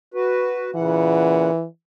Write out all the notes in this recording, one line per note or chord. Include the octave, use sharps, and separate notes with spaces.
F#4 B4
A#2 C#3 E3 F#5